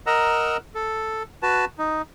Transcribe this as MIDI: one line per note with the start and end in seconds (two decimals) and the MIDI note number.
0.06 0.57 70
0.06 0.57 75
0.06 0.57 78
0.06 0.57 82
0.06 0.57 88
0.75 1.23 69
1.42 1.65 66
1.42 1.65 71
1.42 1.65 81
1.78 2.02 63